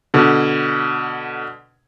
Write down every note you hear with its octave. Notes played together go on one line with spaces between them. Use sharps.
B2 D3